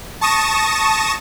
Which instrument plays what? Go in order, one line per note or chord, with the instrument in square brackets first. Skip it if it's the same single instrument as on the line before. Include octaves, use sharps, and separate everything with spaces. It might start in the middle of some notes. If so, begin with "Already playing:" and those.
[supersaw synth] A5 C#6 D#6 A#6 E7